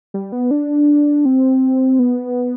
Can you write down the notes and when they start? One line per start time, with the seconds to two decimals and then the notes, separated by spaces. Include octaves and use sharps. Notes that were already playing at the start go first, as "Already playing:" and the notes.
0.14 G3
0.32 B3
0.51 D4
1.25 C4
1.99 B3